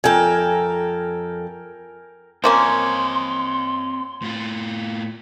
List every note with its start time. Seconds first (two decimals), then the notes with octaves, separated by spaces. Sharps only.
0.04 F2 A4 A#4 G5 G#5
2.44 F3 A#3 C4 C#4 D#5 C6
4.22 A2 F4